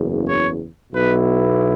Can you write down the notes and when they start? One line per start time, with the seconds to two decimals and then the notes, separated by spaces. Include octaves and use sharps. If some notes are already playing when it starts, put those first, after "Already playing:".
Already playing: F#1 E2 C#3
0.25 C#5
0.91 B1 B2 B3 E4 B4